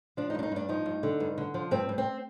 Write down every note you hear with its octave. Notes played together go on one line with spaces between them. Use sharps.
F3 D4
D#4
G2 D4
D#4
G2 D4
F3 D#4
G2
D3
G2
D3
F3
G2 C4
G2
C4